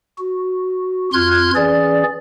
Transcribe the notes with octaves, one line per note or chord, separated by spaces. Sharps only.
F#4
F2 F4 C6 F6 F#6 G#6
E3 C#4 G#4 D5